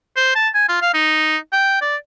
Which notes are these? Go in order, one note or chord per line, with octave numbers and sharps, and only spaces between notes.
C5
A5
G#5
F4
F5
D#4
G5
D5